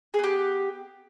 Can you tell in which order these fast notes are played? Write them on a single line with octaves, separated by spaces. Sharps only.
G#4 B3 G4